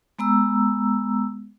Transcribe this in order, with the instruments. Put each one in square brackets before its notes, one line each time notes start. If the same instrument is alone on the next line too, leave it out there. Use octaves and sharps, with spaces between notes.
[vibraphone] G#3 B3 A#5 E6